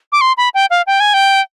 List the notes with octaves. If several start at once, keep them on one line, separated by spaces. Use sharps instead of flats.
D6
C6
B5
G5
F5
G5
G#5
G5